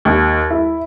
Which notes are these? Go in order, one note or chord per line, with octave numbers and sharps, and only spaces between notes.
D#2
E4